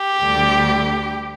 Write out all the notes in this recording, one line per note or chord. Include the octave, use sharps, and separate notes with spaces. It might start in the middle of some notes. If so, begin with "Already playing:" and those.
Already playing: G4
D2 D3 G3